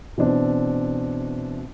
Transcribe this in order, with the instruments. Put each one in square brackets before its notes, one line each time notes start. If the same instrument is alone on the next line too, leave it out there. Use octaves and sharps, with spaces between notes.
[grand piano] B2 E3 C4 D4